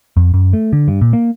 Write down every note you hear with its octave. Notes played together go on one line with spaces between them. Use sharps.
F2
F#2
A3
D3
G2
A#2
A#3